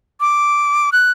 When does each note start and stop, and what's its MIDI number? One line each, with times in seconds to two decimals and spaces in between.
0.20 0.90 86
0.92 1.11 90